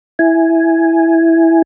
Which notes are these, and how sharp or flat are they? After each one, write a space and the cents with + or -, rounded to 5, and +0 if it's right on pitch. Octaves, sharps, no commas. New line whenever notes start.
E4 +0 G#5 +0